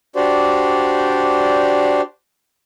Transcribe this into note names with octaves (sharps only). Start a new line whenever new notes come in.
D4 F#4 G4 C5 D5